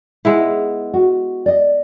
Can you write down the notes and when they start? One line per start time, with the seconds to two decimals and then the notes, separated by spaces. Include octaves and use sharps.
0.25 G#3 B3 E4
0.94 F#4
1.46 D5 D#5